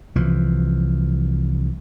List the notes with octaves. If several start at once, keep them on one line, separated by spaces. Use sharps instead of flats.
C2 E3 F3